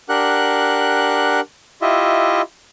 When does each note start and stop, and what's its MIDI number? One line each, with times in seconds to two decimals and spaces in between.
0.09 1.40 62
0.09 1.40 67
0.09 1.40 70
0.09 1.40 78
0.09 1.40 90
1.82 2.42 64
1.82 2.42 65
1.82 2.42 67
1.82 2.42 75
1.82 2.42 76